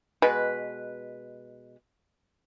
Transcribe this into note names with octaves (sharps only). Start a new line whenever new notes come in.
B2 G#3 B4